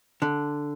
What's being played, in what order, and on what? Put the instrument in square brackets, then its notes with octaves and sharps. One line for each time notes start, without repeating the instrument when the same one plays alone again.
[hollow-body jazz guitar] D3